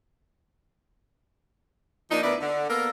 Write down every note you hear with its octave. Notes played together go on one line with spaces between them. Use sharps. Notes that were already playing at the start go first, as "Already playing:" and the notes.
F3 A#3 D4 D#4
D2 B3 D4 E4 A#4 D5
D3
A#3 B3 A4 A#4